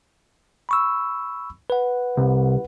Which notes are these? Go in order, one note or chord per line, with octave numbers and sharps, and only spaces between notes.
B5 C#6 E6
B4 F#5
C2